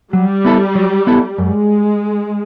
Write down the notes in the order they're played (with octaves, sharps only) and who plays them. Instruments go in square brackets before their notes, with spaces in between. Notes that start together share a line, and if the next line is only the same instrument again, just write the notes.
[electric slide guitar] F#3 [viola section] G3
[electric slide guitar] B3 E4 A4
F#3
B3 E4 A4
[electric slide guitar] F#2 [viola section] G#3